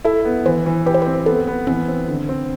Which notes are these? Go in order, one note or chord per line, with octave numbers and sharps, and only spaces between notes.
E4 A4
B3
E3 C5
E3
G4 B4
C5
C4 B4
B3 A4
B3
E3 C4
C4
D3
C4